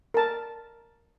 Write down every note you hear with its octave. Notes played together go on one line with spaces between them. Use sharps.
A#4 A5